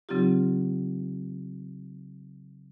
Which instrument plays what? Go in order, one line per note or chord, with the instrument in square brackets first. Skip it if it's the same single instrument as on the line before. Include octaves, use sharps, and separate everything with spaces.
[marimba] C#3 F#3 C4 D#4 F4 G4